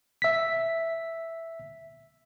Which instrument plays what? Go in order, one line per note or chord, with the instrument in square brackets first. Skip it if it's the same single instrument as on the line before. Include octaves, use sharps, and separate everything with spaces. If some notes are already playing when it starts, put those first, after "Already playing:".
[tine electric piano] E5 B6